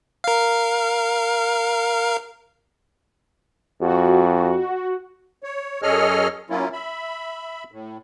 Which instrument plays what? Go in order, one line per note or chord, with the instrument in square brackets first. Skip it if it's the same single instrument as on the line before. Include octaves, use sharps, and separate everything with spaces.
[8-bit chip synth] A#4 F5
[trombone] F2 [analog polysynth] F#4
[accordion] C#5
F#2 G#4 A4 C#5 D#5 F6
F#3 A#3 C#4 E4 F4
E5 B5
A2